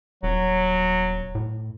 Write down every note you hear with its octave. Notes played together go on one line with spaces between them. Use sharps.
D#1 F#3
A2